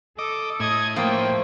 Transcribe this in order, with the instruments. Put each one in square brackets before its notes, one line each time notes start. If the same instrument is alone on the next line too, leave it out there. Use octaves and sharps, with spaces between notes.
[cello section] A4 [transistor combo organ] D#5 D6
[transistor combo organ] A2 [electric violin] D#5 G#6
[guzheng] F3 [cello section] A3 [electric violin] A#3 G5